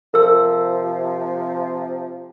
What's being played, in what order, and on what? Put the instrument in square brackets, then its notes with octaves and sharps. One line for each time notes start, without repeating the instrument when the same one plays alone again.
[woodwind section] C3 F3 [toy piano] A#4 E6